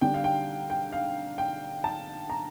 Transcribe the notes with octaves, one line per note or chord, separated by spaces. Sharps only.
D3 G3 D4 G5
F5
G5
G5
F5
G5
A5
A#5